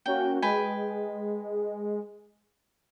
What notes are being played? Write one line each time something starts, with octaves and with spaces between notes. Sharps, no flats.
A#3 C#4 F#4 G5
G#3 B4 G5 G#5